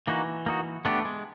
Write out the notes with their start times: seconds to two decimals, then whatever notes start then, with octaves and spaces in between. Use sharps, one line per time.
0.07 E3 A#3 D#4 F#4
0.46 A#3 D#4 F#4
0.85 A3 B3 D4 G4
1.05 G#3